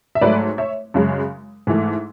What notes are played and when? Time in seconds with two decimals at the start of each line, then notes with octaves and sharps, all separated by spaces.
0.15 E5
0.21 G#2 F#3 A3 B4 D5
0.58 C#5 E5
0.94 F#2 C#3 G#3
1.67 G#2 E3 A3